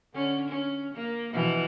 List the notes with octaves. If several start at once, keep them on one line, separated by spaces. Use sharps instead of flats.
D3 C#4
C#4
A#3
B2 E3 F3